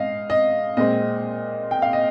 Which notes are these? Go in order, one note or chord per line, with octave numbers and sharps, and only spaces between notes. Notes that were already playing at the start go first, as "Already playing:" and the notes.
Already playing: G#2 D#5 F5
D#5
A#2 G#3 C4 D#5
G5
F5
D#5